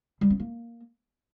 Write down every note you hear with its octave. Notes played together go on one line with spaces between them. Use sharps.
G3
C4
A#3